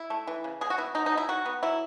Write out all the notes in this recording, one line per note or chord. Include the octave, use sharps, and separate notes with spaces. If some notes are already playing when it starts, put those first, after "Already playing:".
Already playing: E4
A3
E3
C#3
B2 G#4
F#4
B3 E4
F#3 D#4
D#4
B2
E4
D#3 F#4
B3
F#3 E4